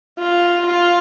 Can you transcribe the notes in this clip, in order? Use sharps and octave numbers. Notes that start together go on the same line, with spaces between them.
F4
F4